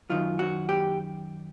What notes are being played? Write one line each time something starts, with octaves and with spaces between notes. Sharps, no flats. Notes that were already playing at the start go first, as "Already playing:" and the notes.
F#2 D#3 F#3 F4
F#4
G4